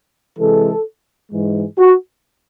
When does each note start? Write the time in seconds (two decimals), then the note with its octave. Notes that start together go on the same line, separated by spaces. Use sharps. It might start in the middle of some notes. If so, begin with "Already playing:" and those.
0.39 C3 E3 G#3 A4
1.32 G#2 E3 G#3
1.79 F#4